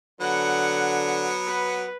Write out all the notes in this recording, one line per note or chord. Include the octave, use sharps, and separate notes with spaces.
D3 F#3 B3 F#5
B4